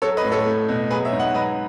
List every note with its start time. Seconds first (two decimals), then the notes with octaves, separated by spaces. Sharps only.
0.02 F#3 A4 C#5
0.17 B4 D#5
0.24 A2
0.32 A4 C#5
0.46 A3
0.69 B2
0.91 F#3 G#4 B4
1.05 C#5 E5
1.12 G#2
1.20 D#5 F#5
1.34 F#3 B4 D#5